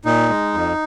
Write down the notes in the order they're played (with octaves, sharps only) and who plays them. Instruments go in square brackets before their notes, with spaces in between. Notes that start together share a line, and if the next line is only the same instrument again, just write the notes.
[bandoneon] A#2 D#4
G#3
F2